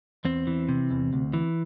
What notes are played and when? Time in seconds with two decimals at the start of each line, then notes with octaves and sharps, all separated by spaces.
0.25 E2 C4
0.47 E3
0.69 C3
0.91 E2
1.13 D2
1.33 E3